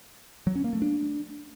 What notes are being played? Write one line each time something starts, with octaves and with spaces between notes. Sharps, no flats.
F#3
C#4
A#3
A3
D4